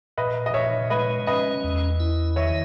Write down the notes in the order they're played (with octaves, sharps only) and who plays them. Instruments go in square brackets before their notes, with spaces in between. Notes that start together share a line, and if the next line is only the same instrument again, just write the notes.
[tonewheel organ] A#2 [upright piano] B4 D#5
[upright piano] D#5
[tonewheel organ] A#2 [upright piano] C#5 E5
[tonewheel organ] G#3 [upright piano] B4 D#5
[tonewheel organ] C#4 [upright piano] B4 D#5
[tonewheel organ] E2
E4
[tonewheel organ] D#3 [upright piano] C#5 E5